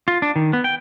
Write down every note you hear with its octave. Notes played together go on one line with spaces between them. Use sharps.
F4
D4
D#3
B3
G5